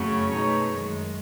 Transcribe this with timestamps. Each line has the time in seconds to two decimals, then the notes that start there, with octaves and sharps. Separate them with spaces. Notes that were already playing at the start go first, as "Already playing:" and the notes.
Already playing: F#2 C#3 F#3 A3 C#4
0.30 B2 A3 D#4 G#4 C#5
0.73 F#2 D#3 G#3